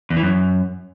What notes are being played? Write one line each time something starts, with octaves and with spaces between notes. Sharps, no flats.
E2
E3
F#2